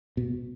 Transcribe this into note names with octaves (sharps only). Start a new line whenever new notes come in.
B2